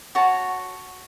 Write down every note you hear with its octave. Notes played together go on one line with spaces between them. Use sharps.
F#4 C#5 A5